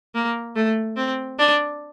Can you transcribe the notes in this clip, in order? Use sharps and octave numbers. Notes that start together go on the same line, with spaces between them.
A#3
A3
C4
D4